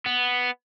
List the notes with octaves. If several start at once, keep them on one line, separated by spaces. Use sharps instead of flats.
B3